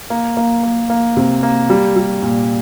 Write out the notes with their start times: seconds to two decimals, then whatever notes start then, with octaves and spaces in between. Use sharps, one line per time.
0.10 A#3
0.37 A#3
0.63 A#3
0.90 A#3
1.17 C3
1.43 A#3
1.70 G3
1.96 G3
2.23 A#2